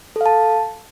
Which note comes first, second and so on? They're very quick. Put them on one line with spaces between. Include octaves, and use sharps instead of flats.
A4 F5 A5